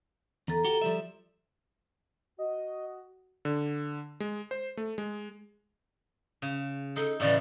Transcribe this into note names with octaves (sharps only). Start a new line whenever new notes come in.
E2 A4 A#5
F#4 G4
F3 G3 E5
F#4 D#5
D3
G#3
C5
A3
G#3
C#3
D#4 A4
A2 C#3 E3 D5